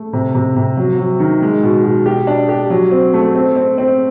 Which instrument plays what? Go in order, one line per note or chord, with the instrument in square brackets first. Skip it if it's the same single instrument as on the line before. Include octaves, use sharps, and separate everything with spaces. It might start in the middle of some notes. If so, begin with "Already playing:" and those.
Already playing: [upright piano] A3
C3
C3
C3
F#3
F#3
D#3
G#3
B2
B2
G4
D4
G4
F#3
C4
A3
C4
C4
C4